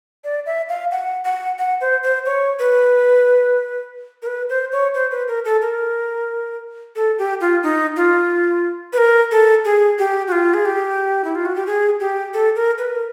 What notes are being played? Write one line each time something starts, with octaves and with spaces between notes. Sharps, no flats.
D5
E5
F5
F#5
F#5
F#5
C5
C5
C#5
B4
A#4
B4
C5
C#5
C5
B4
A#4
A4
A#4
A4
G4
F4
D#4
F4
B4
A#4
A4
G#4
G4
F#4
F4
G#4
G4
E4
F4
F#4
G4
G#4
G4
A4
A#4
B4
A#4